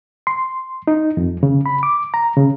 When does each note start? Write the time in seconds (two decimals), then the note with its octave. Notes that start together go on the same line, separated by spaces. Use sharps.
0.27 C6
0.88 D#4
1.17 F2
1.43 C#3
1.66 B5
1.83 D6
2.14 A#5
2.37 C#3